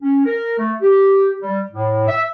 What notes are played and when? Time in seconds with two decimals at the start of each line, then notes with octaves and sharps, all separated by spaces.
0.01 C#4
0.25 A#4
0.58 A3
0.81 G4
1.42 G3
1.71 A2
2.08 E5